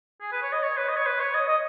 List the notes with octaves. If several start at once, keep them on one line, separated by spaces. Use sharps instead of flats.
G#4
B4
C#5
D#5
C#5
B4
D#5
C#5
B4
C#5
D#5
D#5